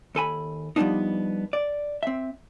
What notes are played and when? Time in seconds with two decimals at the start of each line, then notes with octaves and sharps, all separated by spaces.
0.15 D#2 A4 G#5 B5
0.76 F3 G3 A#3 B3 D4 D#4
1.53 D5
2.03 C4 E5